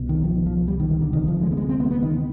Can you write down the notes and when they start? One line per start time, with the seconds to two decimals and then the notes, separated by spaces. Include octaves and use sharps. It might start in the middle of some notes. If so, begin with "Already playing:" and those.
Already playing: C2 B2
0.09 D#3
0.24 F3
0.46 F3
0.68 G3
0.80 D#3
0.91 D#3
1.02 D3
1.13 D2 C3 D#3
1.28 F3
1.42 G#3
1.52 B3
1.57 G#3
1.69 C4
1.80 B3
1.91 B3
2.02 D#3